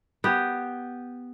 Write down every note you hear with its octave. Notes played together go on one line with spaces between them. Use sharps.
B3 G4